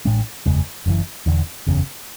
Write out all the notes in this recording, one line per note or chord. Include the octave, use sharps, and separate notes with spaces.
A1 A2 G#3 D4
F#1 E2 C#3 G#3
F#1 F#2 C#3 E3
E1 E2 D3
F#1 E2 C#3